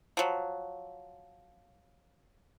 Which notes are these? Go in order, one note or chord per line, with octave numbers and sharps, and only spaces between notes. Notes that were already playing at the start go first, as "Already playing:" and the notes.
F3 F#3